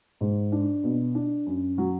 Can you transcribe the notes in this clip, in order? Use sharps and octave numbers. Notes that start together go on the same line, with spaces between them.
G#2
D4
B2
D4
F#2
F#3